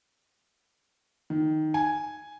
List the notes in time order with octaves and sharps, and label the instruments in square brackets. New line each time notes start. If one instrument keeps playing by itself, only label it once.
[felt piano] D#3
G#5